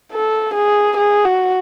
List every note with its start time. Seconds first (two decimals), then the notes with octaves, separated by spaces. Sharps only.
0.12 A4
0.54 G#4
0.97 G#4
1.25 F#4